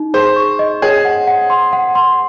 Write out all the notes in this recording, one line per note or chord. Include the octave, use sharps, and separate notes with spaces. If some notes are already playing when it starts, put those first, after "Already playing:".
Already playing: D#4
G#4 C5
C#6
D#5
G#4 C#5
F#5
F#5
C6
F#5
C6